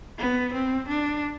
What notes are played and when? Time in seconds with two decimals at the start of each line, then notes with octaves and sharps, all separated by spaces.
0.18 B3
0.54 C4
0.88 D4